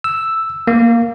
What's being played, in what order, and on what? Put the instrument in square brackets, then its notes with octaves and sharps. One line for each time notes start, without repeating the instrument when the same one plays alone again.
[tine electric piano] E6
A#3